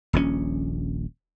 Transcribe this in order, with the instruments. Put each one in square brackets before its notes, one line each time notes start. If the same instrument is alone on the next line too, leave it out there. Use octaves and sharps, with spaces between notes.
[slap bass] D#1 A#1 A#2 C#4